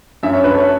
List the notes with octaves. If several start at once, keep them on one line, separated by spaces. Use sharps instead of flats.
F#2 E5
C#5
F#2 B4
A4 C#5